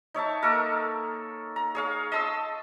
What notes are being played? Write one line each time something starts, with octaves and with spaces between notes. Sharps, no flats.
D#4 C#5 E5 A5
A#3 A4 A#4
A#5
G#4 C#5 F5
D#5 A5 C6 E6